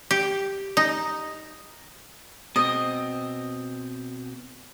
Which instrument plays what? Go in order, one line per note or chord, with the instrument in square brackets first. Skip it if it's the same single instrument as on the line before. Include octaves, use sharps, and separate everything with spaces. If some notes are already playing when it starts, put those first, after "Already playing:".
[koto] G4
D#4
[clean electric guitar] B2 C4 [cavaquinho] D#5